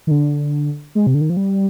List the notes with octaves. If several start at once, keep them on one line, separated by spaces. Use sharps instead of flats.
D#3
D3
G#3
C3
D3
D#3
F3
G3